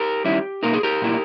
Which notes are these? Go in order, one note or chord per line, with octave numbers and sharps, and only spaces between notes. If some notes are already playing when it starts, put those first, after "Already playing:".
Already playing: G4 A#4
D#3 G3 C#4 E4
B2 A#3 D#4 A#4
G#4
G4 A#4
A#2 A#3 E4